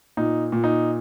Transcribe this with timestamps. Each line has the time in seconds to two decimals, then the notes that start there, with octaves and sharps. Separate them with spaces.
0.17 A#2 D#4
0.52 A#2
0.64 D#4